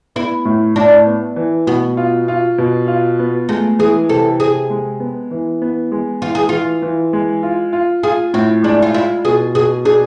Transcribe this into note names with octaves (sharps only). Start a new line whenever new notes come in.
B3 E4
A2
A2 D4
B3
E3
B2 B3
F4
F4
B2
F4
B3
G#3 A3
E3 G#4
C3 A4
C3 G#4
G#3
B3
E3
B3
G#3
E3 F4
G#4
E3 F4
E3
G#3
F4
F4
F4 G#4
A2 C4
G#3 D4
F4
E4 F4
B2 G#4
B2 G#4
D4 G#4